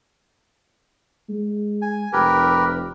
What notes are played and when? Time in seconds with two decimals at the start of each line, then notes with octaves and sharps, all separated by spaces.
1.29 G#3
1.82 G#5
2.13 F1 G4 A#4 B4